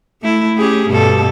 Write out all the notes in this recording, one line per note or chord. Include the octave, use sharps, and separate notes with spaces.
A3 E4
C#4 G4 G#4
G2 B2 A4